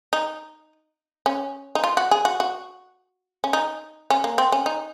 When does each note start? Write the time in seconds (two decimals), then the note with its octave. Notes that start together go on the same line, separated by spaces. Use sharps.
0.13 D#4
1.26 C#4
1.75 D#4
1.84 F4
1.97 F#4
2.11 G#4
2.25 F#4
2.40 F#4
3.44 C#4
3.53 D#4
4.10 C#4
4.24 A#3
4.38 C4
4.52 C#4
4.66 D#4